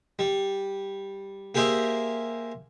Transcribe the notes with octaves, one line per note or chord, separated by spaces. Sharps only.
G3
A#3 G4 G#4 C5 E5